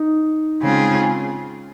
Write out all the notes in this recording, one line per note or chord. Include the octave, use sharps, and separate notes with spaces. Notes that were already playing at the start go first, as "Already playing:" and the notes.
Already playing: D#4
C#3 G#3 C4 F4 G#4